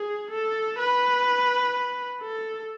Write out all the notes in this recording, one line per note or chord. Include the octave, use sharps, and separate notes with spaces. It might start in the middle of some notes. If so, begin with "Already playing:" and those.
Already playing: G#4
A4
B4
A4